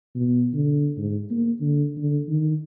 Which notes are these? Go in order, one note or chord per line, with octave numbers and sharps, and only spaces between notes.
B2
D3
G#2
A#3
D3
D3
D#3